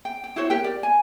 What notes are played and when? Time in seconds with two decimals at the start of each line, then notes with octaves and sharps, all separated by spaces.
0.05 G5
0.24 G5
0.36 E4 F#4 C5 C#5
0.50 G4 A#4 G5
0.64 D5
0.83 G#5